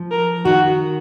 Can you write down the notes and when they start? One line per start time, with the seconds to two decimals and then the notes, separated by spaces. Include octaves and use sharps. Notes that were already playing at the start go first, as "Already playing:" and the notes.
Already playing: F3
0.11 A#4
0.45 D#3 F#4